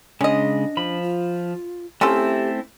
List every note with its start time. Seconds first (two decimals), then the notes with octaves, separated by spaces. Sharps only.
0.21 C#3 G#3 C#4 D4 D#5
0.77 F3 B5
1.02 F4
2.01 A3 C4 C#4 E4 F4 G4 A4